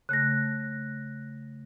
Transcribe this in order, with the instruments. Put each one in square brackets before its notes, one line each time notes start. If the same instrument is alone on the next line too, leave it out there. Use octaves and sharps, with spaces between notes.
[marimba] C#3 A3 [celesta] F#6 A#6